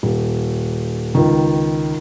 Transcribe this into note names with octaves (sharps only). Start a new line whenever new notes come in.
D#1
C#2 D#3